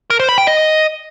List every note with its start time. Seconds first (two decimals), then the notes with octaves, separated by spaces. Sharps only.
0.10 A#4
0.20 C5
0.29 B5
0.38 G5
0.47 D#5